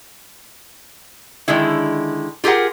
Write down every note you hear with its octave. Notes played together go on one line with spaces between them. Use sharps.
D3 D#3 G#3 E4
F4 G4 G#4 A#4 F#5